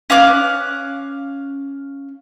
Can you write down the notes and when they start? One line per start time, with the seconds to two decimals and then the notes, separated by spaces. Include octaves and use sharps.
0.10 C#4 F5 D6 F#6